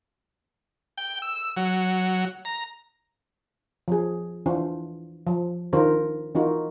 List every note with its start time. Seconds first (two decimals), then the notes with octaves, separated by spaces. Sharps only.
0.98 G5
1.22 E6
1.57 F#3
2.45 A#5
3.88 F3 G#4
4.46 E3 D4 F4 C5
5.27 F3
5.73 D#3 D4 F4 A#4 C5
6.35 E3 D#4 F4 F#4 A#4